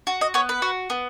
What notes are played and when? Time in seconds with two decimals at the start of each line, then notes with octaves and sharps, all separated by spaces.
0.07 F#4
0.21 D#5
0.34 B3 C#5
0.49 B4
0.62 F#4
0.90 B3